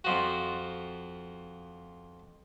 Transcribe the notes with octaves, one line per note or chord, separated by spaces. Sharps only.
F2 F3 F#4